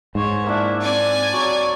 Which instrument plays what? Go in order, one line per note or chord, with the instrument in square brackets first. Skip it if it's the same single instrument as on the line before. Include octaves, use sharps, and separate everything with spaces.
[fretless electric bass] G#2 [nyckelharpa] C5 C#5
[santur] A#3 D4 [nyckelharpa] E4
[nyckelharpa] C4 [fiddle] D5 G#5
[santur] F#3 C#5 [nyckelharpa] C#6